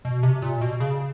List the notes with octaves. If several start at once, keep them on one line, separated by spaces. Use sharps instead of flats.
B2
C3
A#2
B2
C#3